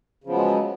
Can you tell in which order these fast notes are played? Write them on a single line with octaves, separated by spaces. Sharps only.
C#3 F3 B3 F#3 G#3